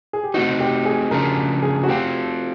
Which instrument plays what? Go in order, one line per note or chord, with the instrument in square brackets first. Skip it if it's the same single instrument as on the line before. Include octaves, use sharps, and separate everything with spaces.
[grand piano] G#4
G4
[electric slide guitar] A3 C4 D#4 [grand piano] F#4
[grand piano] G4
G#4
[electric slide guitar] C#3 F3 A3 D4 [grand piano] A#4
[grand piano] G#4
F#4
[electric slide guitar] A3 C4 F4 [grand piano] G4